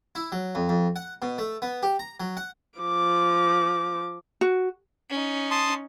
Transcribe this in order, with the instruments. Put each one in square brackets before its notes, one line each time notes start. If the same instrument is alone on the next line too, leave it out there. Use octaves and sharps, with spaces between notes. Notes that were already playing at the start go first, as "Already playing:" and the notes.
[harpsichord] E4
F#3
F2
F2
F#5
B2
A3
B3
G4
A#5
F#3
F#5
[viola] F3 D6
[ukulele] F#4
[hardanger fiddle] C#4 D#4
[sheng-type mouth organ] A5 C6 D#6